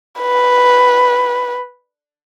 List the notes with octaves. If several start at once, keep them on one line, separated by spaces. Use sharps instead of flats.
B4